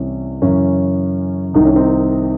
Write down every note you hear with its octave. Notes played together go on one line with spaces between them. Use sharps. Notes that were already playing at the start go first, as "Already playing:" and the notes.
Already playing: C2 C3 E3 C#4
F#2 C#3 E3 C#4
C2 C3 D#3 D#4
C#4
C4 D#4